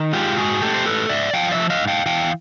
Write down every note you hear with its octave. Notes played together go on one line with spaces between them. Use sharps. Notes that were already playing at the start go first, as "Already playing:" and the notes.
Already playing: D#3
G#3 F4 G4
G#2 F#4 G#4
A3 G4 A4
C5
G#2 A4 B4
G#2 D5 E5
F3 F5 G5
D5 E5
A3
D#5 F5
G#2
F5 G5
E3 F5 G5